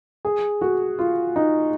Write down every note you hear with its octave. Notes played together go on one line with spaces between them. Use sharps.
G#4
F#4
F4
D#4